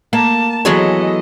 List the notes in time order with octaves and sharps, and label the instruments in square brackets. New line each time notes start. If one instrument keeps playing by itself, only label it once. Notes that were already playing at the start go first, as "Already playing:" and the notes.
[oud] A#3 [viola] A5
[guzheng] E3 G#3 C#5 [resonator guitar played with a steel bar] F#3 B3 [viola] A4 D#5